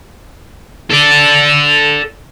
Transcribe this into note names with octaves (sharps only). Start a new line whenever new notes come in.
A4 D5